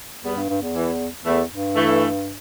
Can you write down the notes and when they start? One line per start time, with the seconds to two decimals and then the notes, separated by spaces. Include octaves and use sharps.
0.24 E2 G3 B3
0.36 G2
0.49 G2
0.62 E2
0.75 E3
1.25 E2 E3 A3
1.50 G2
1.75 E3 A3